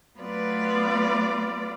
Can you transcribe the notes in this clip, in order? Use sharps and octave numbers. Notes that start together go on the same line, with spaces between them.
F#3 A3 B3 F4 B4 D5